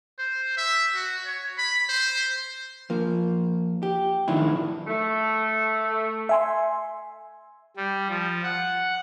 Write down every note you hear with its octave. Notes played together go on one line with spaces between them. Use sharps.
C5
E5
F#4
C#5
B5
C5
F3 A#3
G4
F#2 A2 D#3 F3 D4 E4
A3
E5 G#5 C6
G3
F3
F#5